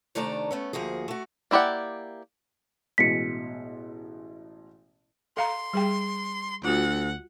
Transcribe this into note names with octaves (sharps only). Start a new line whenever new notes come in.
C3 D#3 A3 D4 D5 A#5
A3 B3 C#4
D2 F3 A#3 F#4 G#4
A3 F#4
A#3 E4 G4 D5 F#5
A1 B2 G#3 B6 C#7
A4 F5 A#5 C6
G3 G#4 G5
D2 F4 F#4 F#5